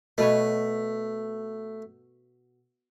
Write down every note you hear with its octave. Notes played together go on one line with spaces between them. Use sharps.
B2 A3 B4 C#5